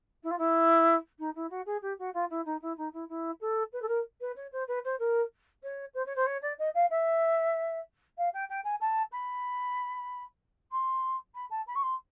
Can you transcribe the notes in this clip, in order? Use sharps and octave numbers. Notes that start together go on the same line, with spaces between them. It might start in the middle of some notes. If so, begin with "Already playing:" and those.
E4
F4
E4
D#4
E4
F#4
G#4
G4
F#4
F4
E4
D#4
E4
D#4
E4
E4
A4
B4
A4
A#4
B4
C#5
C5
B4
C5
A#4
C#5
C5
C#5
C5
C#5
D5
D#5
F5
E5
F5
G5
G5
G#5
A5
B5
C6
B5
A5
B5
C#6
C6